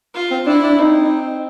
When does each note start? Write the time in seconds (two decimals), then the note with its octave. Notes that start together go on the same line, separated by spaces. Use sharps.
0.15 F4
0.31 C4
0.47 D4 E4
0.64 D4
0.79 C4 D#4